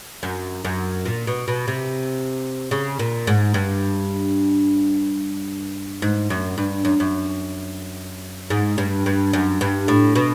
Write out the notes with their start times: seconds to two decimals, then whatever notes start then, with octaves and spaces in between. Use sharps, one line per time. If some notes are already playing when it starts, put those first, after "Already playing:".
0.23 F#2
0.65 F#2
1.06 A#2
1.27 B2
1.48 B2
1.68 C3
2.71 C#3
2.99 A#2
3.27 G#2
3.54 G2
6.02 G#2
6.30 F#2
6.58 G2
6.85 F#2
7.00 F#2
8.50 G#2
8.78 G2
9.06 G2
9.33 F#2
9.61 G2
9.88 A2
10.15 B2